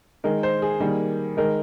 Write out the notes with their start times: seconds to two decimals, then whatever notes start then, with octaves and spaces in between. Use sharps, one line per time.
0.24 D#3 G#3 A#4
0.43 C5
0.62 G#4
0.80 D#3 G3 A#3
1.37 D#3 G#3 A#4